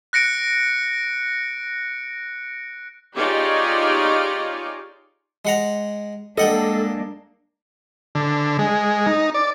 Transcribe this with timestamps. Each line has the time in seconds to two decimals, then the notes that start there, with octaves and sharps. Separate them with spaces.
0.13 F#6 A#6 C#7 D7
3.16 D#4 F4 G4 G#4 C#5 D5
5.45 G#3 F#5 A#5
6.38 G#3 A#3 D4 A4 D#5 F#5 G5
8.15 D3
8.59 G#3
9.07 D#4
9.34 D5